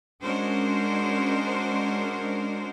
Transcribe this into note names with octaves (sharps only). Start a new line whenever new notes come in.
G#3 C#4 D4 F#4 A#4 C5